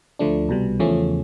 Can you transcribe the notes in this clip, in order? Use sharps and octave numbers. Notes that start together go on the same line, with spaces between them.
D2 D3 F3 A3 D4
C2 B2 G3
E2 C#3 F3 A3 C#4